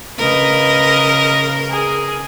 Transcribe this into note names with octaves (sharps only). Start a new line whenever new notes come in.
C#3 A#4 B4 D#5
G#4